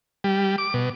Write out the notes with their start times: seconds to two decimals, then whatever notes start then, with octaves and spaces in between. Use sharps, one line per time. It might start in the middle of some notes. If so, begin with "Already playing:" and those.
0.24 G3
0.58 D6
0.74 B2